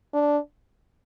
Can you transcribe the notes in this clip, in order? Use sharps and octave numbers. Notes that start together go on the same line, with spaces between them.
D4